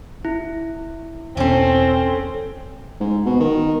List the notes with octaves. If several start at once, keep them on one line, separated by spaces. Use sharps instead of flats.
E4
E2 B2 C4 C#4 A4
G#2
B2
D#3